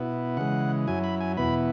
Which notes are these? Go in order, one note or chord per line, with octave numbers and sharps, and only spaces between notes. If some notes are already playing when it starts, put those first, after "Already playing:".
Already playing: B2 B3 E4
C#3 E3 G#3 F#5
F#2 F#3 E4 G#5
B5
G#5
E2 B2 B3 E4 B5